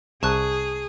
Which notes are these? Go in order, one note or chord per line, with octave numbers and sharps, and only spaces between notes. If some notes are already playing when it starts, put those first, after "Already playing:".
C2 G#4 A5 C#6 F#6